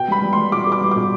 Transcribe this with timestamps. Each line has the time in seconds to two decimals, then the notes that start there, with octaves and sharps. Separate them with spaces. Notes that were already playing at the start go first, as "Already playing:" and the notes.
Already playing: B2 G5
0.08 G3 B5
0.22 G3
0.33 G3 C6
0.52 B2 D6
0.67 B2
0.72 D6
0.81 G3
0.91 D6
0.96 B2